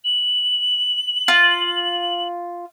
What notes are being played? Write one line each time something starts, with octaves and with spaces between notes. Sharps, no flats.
F#7
F4